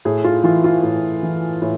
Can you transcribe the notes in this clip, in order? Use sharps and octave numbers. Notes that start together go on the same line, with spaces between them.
A2 G#4
F4
E3 F4
F4
A2
E3
A2